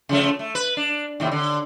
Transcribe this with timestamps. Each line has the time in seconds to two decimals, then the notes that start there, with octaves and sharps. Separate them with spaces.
0.09 C#3 F3 A3
0.39 A3
0.55 B4
0.77 D4
1.20 D#2 A2 C3
1.32 D3